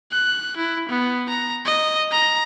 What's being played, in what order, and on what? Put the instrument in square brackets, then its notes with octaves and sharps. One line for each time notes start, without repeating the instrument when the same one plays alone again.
[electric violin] F#6
E4
B3
A#5
D#5
A#5